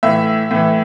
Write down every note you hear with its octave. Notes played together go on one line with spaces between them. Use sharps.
A2 E3 E5
A2 E3